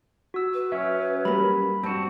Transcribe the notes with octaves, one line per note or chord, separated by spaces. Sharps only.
F#4 E6
B4
F#3 C#4 E5
G3 A#3 B5
G2 C4 F#4 A5